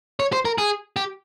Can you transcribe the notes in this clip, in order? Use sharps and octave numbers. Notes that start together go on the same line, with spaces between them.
C#5
C5
A#4
G#4
G4